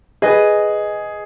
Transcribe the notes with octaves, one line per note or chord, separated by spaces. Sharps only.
G#4 B4 D#5 G#5